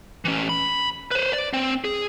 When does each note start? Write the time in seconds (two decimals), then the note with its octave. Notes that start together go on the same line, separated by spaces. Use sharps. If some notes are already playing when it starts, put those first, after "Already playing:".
0.25 E3 C#4
0.49 B5
1.11 B4 C5
1.33 D5
1.54 C4
1.84 G#4